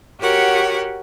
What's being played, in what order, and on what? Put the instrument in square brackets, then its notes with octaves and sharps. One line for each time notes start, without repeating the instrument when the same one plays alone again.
[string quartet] F#4 G4 A#4 C#5 F#5